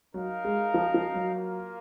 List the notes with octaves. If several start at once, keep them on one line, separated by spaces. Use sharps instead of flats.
F#3 D#4 A#4 F5
G#3
F3
F3
F#3
A#3 F4 A#4